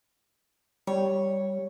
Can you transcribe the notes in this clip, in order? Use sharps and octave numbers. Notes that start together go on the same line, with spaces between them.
G3 C#5